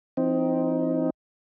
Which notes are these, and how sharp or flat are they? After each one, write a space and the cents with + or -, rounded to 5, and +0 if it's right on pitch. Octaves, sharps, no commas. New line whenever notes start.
F3 -45 C4 +0 D#4 +15